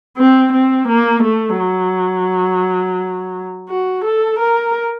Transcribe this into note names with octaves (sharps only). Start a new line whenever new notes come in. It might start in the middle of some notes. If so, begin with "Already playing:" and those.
C4
C4
A#3
A3
F#3
F#4
A4
A#4